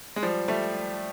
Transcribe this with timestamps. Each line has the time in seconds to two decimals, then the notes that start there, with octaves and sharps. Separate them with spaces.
0.16 G#3
0.23 F3 G3
0.48 G3 A3